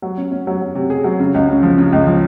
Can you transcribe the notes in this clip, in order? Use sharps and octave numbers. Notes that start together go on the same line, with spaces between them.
F#3
C#4
C#4
F#3
F#3
C3
G#4
F#3
C#3
C#2
C#3
F3
C#3
C#2
F3